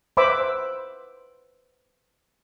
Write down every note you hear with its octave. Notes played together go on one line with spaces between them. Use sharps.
B4 C5 E5 B5 D6 E6